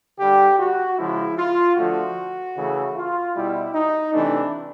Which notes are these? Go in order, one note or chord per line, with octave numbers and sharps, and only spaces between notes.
D3 G3 G4
F#4
C#3 F3 G#3 E4
F4
D3 F3 A3 F#4
C#3 E3 A3
F4
B2 G3 E4
D#4
C3 E3 A3 D4